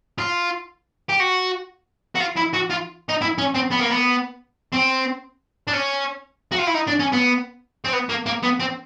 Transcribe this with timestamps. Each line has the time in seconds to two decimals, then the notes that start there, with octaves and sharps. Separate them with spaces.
0.18 F4
1.09 G4
1.20 F#4
2.15 F#4
2.20 F4
2.37 E4
2.54 F#4
2.70 F4
3.09 D#4
3.21 E4
3.38 C#4
3.55 C4
3.71 B3
3.80 A#3
3.90 B3
4.72 C4
5.68 D4
5.74 C#4
6.52 F#4
6.59 F4
6.67 E4
6.74 D#4
6.87 D4
6.99 C#4
7.12 B3
7.84 C4
7.93 B3
8.09 A#3
8.26 A#3
8.43 B3
8.60 C4